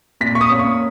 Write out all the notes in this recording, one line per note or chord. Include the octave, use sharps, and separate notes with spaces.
A#2 B6
C#6
D#6
A#3 C#4
C#6